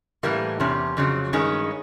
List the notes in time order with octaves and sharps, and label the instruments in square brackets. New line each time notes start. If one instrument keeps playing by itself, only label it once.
[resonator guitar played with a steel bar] A2 E3 G3 A#3
E2 C3 C#4
F2 C#3 F#3
G2 D#3 G#3 C#4